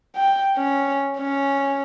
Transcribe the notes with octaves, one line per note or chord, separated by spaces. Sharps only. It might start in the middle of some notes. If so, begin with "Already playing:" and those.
G5
C#4
C#4